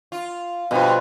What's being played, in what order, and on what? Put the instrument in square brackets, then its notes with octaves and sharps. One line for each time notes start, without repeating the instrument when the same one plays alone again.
[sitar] F4
[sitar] G2 [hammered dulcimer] B2 F3